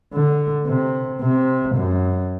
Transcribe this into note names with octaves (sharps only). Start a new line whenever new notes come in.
D3
C3
C3
F#2